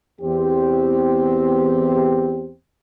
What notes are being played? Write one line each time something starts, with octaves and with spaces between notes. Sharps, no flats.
E2 C4 G4